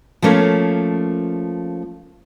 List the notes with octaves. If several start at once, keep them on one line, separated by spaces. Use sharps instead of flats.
F3 A3 A#3 C#4 C#5